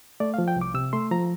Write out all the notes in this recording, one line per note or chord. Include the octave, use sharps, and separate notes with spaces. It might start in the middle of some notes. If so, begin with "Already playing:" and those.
A3 D5
F5
F3
G5
C2
D6
C3 E6
A3 C6
F3 A#5